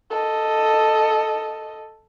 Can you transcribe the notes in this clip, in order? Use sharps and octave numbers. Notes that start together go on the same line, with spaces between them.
A4 D#5